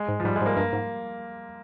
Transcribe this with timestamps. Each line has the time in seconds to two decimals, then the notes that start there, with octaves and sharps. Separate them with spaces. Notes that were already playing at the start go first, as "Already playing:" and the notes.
Already playing: G#3
0.08 G#2
0.20 F3
0.24 G#2 G3
0.36 G#3
0.41 G#2
0.46 A#3
0.57 G2 A#3
0.73 G#2